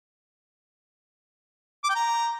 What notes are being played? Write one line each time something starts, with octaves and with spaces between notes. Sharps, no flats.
D6
G5
A#5